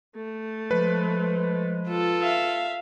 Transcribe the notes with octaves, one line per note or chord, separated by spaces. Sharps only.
A3
F3 G#3 B4
F4 A4
E5 F5